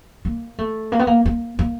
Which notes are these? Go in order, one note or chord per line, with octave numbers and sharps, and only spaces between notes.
A#3
A3
A#3
B3
A#3
A#3
A#3